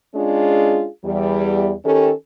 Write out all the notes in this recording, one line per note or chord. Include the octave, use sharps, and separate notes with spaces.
G#3 C#4 D4 F4 G#4
E2 G3
D#3 C#4 G4 A4